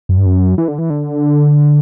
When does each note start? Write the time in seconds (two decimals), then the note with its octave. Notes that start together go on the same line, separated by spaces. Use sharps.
0.09 F#2
0.17 G2
0.26 F#2
0.58 E3
0.68 D3
0.78 E3
0.90 D3